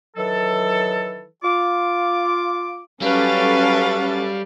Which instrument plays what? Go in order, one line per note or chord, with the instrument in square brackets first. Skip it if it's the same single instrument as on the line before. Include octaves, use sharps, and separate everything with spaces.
[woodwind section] D#3 E3 F#3 A4
F4 D6
[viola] F#3 B4 [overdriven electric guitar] G3 [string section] C#4 A4 A6 [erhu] F5